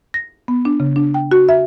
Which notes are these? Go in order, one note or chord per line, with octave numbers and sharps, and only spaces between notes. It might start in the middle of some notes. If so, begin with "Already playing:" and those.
A#6
B3
D4
C#3
D4
G5
F#4
E5